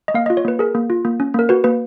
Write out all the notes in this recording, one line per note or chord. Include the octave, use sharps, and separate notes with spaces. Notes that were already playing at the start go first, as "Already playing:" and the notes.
D#5
A#3 F5
D#5
F4
C#5
A#3 B4
G#4 A#4
A#3
F4
A#3
C#4
A#3 A#4
F#4 B4
A#3 B4